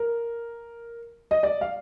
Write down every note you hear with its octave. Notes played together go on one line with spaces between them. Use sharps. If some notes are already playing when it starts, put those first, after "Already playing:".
Already playing: A#4
D#5
D5
F5